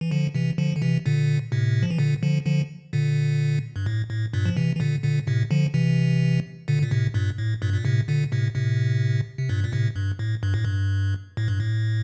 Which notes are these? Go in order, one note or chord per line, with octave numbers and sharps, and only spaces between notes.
E3
D3 F3
C3 E3
D3 F3
D3
C3 E3
A#2 D3
A2 C3
F3
E3
A#2 D3
D3 F3
D3 F3
A#2 D3
G2
A2
A2
G2 A#2
F3
C3 E3
E3
A#2 D3
A#2 D3
A2 C3
D3 F3
C3 E3
A#2 D3
A#2
A2 C3
G2 A#2
A2
G2 A#2
A#2
A2 C3
A#2 D3
A2 C3
A2 C3
C3
G2 A#2
A#2
A2 C3
G2
A2
G2
A2
G2
A2
G2
A2